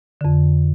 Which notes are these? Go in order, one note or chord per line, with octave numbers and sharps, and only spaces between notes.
F2 D3